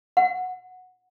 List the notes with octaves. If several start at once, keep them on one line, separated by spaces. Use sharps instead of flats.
F#5